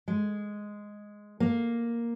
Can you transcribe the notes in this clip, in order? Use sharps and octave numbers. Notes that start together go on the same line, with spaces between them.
G#3
A#3